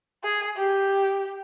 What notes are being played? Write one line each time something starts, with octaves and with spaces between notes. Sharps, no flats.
G#4
G4